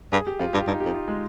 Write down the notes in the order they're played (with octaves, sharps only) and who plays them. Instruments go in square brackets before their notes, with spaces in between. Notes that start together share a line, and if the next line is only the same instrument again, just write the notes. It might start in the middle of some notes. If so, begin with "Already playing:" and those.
[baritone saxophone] G2 [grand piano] G#4
[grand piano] G4
[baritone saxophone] F2 [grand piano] F4
[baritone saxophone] G2 [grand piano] G4
[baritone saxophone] G2 [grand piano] D#4
[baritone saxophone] F2 [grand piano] G4
[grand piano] F4
G#3